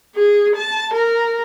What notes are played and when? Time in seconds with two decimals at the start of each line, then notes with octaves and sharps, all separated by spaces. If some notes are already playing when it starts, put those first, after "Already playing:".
0.15 G#4
0.55 A5
0.94 A#4